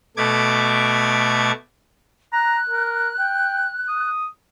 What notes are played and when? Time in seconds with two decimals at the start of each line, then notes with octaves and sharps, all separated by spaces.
0.17 B2 A3 D6 G#6
2.33 A#5 F#6
2.69 A#4
3.19 G5
3.88 D#6